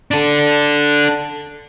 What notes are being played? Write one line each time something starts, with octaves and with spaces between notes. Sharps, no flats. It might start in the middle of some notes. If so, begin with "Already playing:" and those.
D4 A4